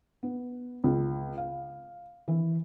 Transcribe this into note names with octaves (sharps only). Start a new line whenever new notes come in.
B3
C#2
F5
E3